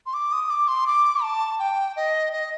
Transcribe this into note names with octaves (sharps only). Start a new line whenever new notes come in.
C6
D6
D#6
D6
C6
D6
A5
G5
D#5
D#5